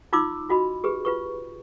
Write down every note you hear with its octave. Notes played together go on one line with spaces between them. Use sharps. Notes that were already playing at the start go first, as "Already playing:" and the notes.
D#4 F4 C6 D6 E6
F4 F#4 D#5 B5
G4 G#4 B4
F4 B4 C#6